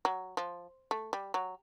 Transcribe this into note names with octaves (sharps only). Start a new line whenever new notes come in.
F#3
F3
A3
G3
F#3